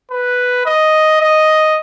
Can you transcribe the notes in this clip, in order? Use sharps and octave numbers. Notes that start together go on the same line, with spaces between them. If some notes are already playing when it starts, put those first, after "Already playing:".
B4
D#5
D#5